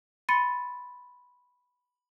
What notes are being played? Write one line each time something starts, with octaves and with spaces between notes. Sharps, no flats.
B5 C6 A6 C#7 D#7